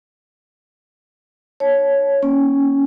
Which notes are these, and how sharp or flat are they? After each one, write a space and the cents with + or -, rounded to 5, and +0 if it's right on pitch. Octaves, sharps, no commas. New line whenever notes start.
D#4 -30 C#5 +0 A5 -30
A#3 +15 C#4 +0